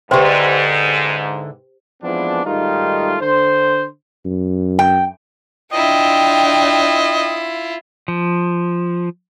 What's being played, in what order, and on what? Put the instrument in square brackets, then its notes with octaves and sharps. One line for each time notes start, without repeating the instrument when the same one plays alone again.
[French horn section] G#2 [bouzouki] D3 E4 [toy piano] G4 C5 [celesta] B4 G5 C6
[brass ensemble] F2 E3 F3 G#3 B3 D4
G#2 D#3 G3 A3 D#4 F4
D3 C5
[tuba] F#2
[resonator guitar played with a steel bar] G5
[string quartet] D4 G5 [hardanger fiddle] E4 F4 [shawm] D#5
[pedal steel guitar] F3